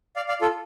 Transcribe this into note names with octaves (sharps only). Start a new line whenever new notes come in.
D5 F5
D5 F5
F4 A4